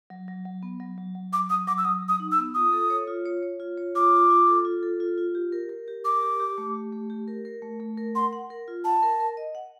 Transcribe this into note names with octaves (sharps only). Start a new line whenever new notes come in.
F#3
F#3
F#3
B3
F#3
F#3
F#3
F#3 D6
F#3 D#6
F#3 D6
E6
F#3 D#6
F#3
D#6
D#4
E6
B3
F4 D#6
A4
C#5
F4
C#5
C#5
F4
C#5
F4 D6
F4
F4
A4
F4
A4
F4
F4
G4
A#4
A#4
G4
A#4 D6
G4
G4
A3
G4
A3
G4
A#4
A#4
A3
A3
A#4
F#5 C6
F#5
A#4
F4
F#5 A5
A#4
A#4
D#5
F#5